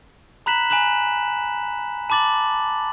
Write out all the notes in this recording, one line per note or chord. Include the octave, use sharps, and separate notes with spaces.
A#5 B5 F#6 B6 E7 F#7
G#5 B5 F#6 E7 F#7
A5 B5 D6 A6 F#7